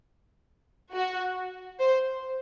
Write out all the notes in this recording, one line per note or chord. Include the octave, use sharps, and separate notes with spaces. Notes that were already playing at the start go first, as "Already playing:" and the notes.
F#4
C5